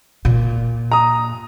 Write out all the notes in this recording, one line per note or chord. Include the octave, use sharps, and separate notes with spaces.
A#2
A#5 D#6